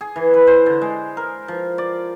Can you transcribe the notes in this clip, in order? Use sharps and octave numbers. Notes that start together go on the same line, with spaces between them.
G#4
E3
B4
C5
D3
G#3
A#4
F3
D5